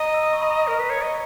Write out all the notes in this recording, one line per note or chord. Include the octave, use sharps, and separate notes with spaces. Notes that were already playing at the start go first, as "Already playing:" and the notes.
Already playing: D#5 A#5
E6
D#6
C#6
B5
A#5
A#4
B4
C#5
D#5